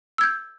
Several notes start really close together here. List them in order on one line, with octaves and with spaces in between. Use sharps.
E6 G#6 G6